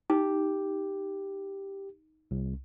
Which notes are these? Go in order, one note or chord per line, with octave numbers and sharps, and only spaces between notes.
D#4 G4
C2